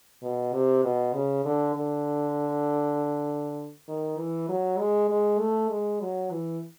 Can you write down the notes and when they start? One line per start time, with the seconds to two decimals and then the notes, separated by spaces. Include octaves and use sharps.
0.23 B2
0.53 C3
0.84 B2
1.14 C#3
1.45 D3
1.75 D3
3.88 D#3
4.18 E3
4.48 F#3
4.79 G#3
5.09 G#3
5.39 A3
5.70 G#3
6.01 F#3
6.31 E3